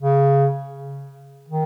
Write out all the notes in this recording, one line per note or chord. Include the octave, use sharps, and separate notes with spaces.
C#3
D#3